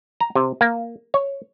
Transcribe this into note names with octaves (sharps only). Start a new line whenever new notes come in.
A#5
C3
A#3
C#5